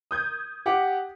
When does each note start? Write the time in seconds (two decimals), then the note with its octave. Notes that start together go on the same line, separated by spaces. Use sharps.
0.11 D#6 G6 G#6
0.66 G4 F#5 D6